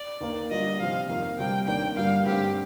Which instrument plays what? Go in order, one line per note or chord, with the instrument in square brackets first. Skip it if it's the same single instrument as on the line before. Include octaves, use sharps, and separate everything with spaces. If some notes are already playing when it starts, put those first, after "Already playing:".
Already playing: [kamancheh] D5
[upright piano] D#2 D#3 A#3
[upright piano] D3 G3 D4 F4 [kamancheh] D#5
[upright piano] C3 F3 C4 [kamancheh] F5
[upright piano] F2 D#3 A#3 [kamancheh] F5
[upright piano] C3 G3 C4 [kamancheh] G5
[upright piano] D#2 D#3 A#3 D4 [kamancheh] G5
[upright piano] G2 D3 G3 A#3 [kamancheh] F5
[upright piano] G2 D3 A3 C4 [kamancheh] G4